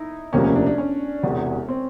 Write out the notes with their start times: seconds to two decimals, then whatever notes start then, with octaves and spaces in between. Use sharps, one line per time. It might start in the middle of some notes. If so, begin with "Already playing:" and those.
Already playing: D#4 E4
0.33 E1 D2 C3 F3 A#3 C#4
0.44 C#4
0.56 D4
0.66 D4
0.78 C#4
1.23 E1 E2 C3
1.69 C4